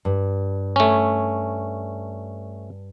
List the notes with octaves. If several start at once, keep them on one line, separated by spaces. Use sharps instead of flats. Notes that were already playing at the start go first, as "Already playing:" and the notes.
G2
A3 C#4